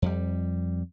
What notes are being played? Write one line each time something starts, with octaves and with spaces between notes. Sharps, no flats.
F2 G3